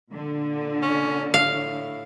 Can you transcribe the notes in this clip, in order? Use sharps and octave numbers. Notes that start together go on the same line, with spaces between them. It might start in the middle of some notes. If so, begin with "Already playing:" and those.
A#2 D3
C#4
A2 F5